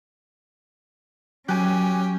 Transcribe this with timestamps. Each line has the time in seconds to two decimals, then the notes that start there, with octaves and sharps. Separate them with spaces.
1.49 F#3 C#4 G4 G#5 F#6